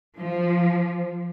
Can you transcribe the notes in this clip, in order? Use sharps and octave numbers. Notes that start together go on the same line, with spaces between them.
F3